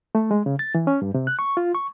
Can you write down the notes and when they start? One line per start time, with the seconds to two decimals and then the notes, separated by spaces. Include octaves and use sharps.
0.15 A3
0.31 G#3
0.46 C#3
0.59 A6
0.75 E3
0.87 C#4
1.02 G2
1.14 C3
1.27 F#6
1.39 C#6
1.57 F4
1.75 C#6